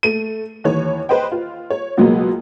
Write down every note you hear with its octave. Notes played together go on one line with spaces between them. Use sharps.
A3 D#7
D#2 E3 C#5
B4 C5 D#5 G5
F4
C#5
C#2 B2 F#3 G#3 A#3 B3